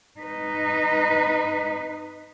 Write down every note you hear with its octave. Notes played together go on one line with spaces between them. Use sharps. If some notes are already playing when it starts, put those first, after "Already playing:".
D#4 B4